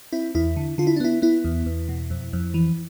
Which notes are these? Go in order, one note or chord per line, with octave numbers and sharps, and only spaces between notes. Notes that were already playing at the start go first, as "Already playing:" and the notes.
C4 E4
E2 E4
D3
D3 F4
E4
D4
B3 E4
B3 E4
E2
E2
B2
F2
F2
E3